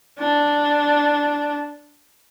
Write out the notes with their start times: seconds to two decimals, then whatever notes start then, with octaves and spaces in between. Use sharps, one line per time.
0.19 D4